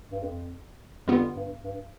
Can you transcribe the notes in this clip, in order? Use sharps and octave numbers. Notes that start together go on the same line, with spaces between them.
G2
F2
F2 D3 G3 B3 F4
G2
G2